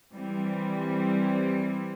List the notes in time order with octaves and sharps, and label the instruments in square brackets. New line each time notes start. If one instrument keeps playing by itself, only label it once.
[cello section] E3 G3 C4